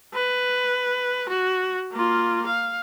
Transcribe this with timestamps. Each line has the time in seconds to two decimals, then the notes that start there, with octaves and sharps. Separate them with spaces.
0.14 B4
1.29 F#4
1.92 A#3 F4
2.46 F5